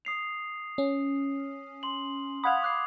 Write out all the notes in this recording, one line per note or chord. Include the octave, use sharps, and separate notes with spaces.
D#6 C7 F7
C#4
C6 F#7
F5 F#5 B5 D#6 G#6 F7
D6 F#6 C7